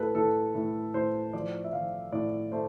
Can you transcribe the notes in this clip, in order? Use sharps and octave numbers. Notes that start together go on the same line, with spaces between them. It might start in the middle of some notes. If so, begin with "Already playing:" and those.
Already playing: A2 A4 B4
A2 A4
A2
A2 C5
F3 D5
E5
F3 F5
A2 D5
A3 C5